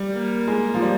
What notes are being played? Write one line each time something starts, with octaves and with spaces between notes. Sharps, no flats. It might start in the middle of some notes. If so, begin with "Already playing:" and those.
Already playing: G3
A#3
G#3
F3
G3